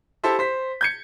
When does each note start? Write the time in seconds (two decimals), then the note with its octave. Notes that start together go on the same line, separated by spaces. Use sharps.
0.24 E4 G4 A4 C5 E5
0.39 C5 B6
0.81 G6 G#6 C#7